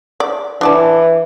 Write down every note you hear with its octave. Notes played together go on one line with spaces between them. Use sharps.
D5
E3 D4 D5 A5